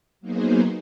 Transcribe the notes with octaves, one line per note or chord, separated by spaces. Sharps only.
F#3 A#3 B3 D#4 G#4 C5